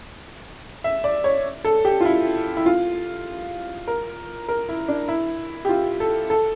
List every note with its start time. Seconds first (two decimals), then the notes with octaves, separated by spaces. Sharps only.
0.84 E5
1.04 D5
1.24 C#5
1.65 A4
1.85 G4
2.01 F4
2.05 E4
2.57 E4
2.66 F4
3.88 A#4
4.48 A#4
4.69 E4
4.88 D4
5.08 E4
5.65 G4
5.69 F4
6.00 A4
6.30 A4